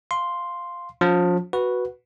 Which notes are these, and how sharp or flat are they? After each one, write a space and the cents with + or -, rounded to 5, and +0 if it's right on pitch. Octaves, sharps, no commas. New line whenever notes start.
F5 +0 C6 +0
F3 +30 C#4 +40
F#4 +0 B4 -5